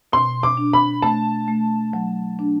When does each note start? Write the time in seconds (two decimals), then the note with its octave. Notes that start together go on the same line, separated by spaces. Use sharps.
0.13 B2 C6
0.43 D6
0.57 D4
0.73 B5
1.02 A3 A5
1.48 A3
1.93 F#3
2.39 D4